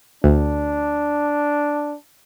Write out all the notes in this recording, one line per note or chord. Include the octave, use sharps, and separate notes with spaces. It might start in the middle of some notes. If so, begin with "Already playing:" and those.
D2 D4